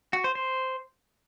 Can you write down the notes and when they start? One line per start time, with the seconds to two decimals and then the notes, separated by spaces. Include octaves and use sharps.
0.13 F#4
0.24 C5
0.35 C5